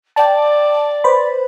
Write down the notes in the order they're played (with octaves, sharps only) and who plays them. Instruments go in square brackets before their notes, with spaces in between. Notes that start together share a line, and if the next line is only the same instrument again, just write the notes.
[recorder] D5 [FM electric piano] G5 A5
[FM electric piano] B4 C5 B5